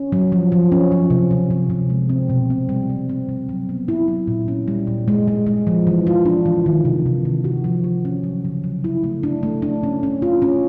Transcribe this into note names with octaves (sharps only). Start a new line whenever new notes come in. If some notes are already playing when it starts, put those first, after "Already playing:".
Already playing: C#4
F#3
F3
F3
C#4
F3
C3
C3
C3
C3
G#3
C4
B2
C4
G3
C4
C4
G3
F#3
B3
E4
F#3
A#2
C#4
G3
A#2
G#3
G#3
G#3
F3
E3
F4
D4
E3
D#3
C3
C3
D#3
F#4
F3
F#4
C#4
F#3
C#3
F#3
E4
A3
D4
A3
D4
C#4
C#4
F4
C#4